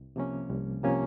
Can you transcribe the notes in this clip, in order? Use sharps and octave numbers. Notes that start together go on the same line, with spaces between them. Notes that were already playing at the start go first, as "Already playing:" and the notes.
Already playing: C2
C3 F3 A#3 C#4
C2
C3 F3 A#3 C#4